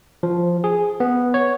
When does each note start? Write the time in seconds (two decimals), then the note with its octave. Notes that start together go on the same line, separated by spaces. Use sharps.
0.23 F3
0.64 G#4
1.00 B3
1.34 C#5